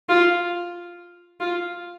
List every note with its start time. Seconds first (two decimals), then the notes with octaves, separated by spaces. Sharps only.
0.09 F4
1.40 F4